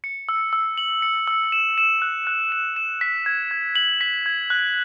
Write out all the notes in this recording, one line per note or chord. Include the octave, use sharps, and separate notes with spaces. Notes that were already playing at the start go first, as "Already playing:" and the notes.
C#7
E6
E6
F#7
C#7
E6
E7
E7
F#6
F#6
E7
E7
B6
G#6
G#6
F#7
B6
G#6
F#6